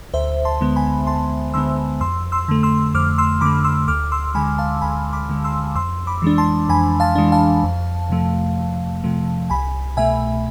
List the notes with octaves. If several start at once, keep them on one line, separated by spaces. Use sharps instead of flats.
D2 C5 E5
A5 C6
D3 G#3 B3
G#5 B5
D2 A5 C6
D3 G#3 B3 C6 E6
F2 C6 E6
C6 E6
D3 A3
C6 E6
F2 D6 F6
C6 E6
D3 A3 B5 D6
C6 E6
D2 D6 F6
C6 E6
D3 G#3 G#5 B5
F5 A5
D2 G#5 B5
B5 D6
D3 G#3
C6 E6
F2 C6 E6
B5 D6
E3 G#3 D4
A5 C6
F2 G#5 B5
F5 A5
E3 G#3 D4
F5 A5
F2
C3 F3 A3
F2
C3 F3 A3
C2 G#5 B5
B2 A3 E5 G#5